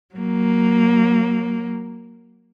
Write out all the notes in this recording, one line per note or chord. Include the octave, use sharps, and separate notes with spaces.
F#3 A#3